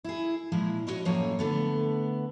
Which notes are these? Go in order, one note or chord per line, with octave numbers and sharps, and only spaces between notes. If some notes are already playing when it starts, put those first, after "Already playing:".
E4 G#4
A#2 F3 G#3 E4
C#4 E4 F#4 C#5 D#5
F#2 A2 F3 A#3 C#5 G#5
D3 A3 B3